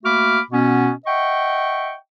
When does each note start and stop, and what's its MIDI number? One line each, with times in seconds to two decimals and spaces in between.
0.04 0.39 57
0.04 0.39 58
0.04 0.39 66
0.04 0.39 83
0.04 0.39 86
0.04 0.39 89
0.52 0.90 47
0.52 0.90 59
0.52 0.90 61
1.06 1.93 75
1.06 1.93 76
1.06 1.93 78
1.06 1.93 79
1.06 1.93 85